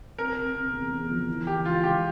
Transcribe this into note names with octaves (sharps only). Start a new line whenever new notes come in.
C4 A#4
C3
C3
E2
E2
F3
E3
E3 G4
C#2 F4
C#2 G4